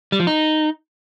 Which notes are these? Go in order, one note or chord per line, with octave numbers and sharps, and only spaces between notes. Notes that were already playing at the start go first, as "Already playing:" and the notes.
G3
F3
D#4